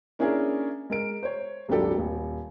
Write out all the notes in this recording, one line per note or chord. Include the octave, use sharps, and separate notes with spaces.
A#3 C#4 D4 E4 G#4 A#4
G#3 A#4 D7
C5 C#5
D#1 G#1 F#3 D4 G4 A4
D#1